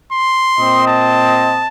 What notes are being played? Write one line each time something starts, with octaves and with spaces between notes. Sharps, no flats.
C6
A#2 C4 D#5
A5